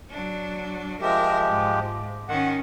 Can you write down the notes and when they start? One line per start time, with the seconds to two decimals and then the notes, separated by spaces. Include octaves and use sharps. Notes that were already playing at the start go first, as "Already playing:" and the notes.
0.10 F#3 D4
1.01 F3 G#3 G4 A#4 E5
1.48 G#2
2.29 D#3 C#4 F#5